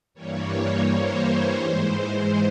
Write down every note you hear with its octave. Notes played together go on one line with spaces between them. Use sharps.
G2 E3 G3 A#3 C#5
C5
G#2 E3 G#3 C5